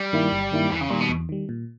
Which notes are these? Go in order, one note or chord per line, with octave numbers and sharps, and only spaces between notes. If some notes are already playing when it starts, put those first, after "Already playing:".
Already playing: G3
G2 D#3 A#3 E4
G1
G2 D#3 A#3 E4
E2 E3
C#3
A#2 D#3 G3
B2
E2
D#3 G3
A#2